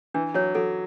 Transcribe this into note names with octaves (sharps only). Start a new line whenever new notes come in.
E3 D4
F#3 C#5
F#3 A4